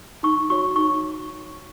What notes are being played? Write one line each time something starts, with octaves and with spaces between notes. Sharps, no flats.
D#4 C#6
F#4 C#5 C#6
D#4 C#6